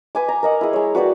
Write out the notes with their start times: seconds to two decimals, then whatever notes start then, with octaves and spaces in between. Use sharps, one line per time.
0.15 B4 G#5 D6
0.28 A#5
0.43 A#4 D#5 F#5
0.61 E4 G#4
0.73 G#3 C#5
0.95 F#4 B4 D5 G5